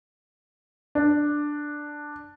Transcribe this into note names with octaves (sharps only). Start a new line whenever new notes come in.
D4